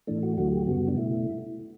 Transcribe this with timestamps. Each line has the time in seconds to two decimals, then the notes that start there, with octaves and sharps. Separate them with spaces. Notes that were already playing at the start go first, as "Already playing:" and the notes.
0.07 A2 E3 A3 D4
0.23 F#4
0.37 D2 D3 F#3 A3 F#4
0.52 G4
0.67 F#2 C#3 G3 B3 F#4
0.88 D4
0.96 B2 A3 E4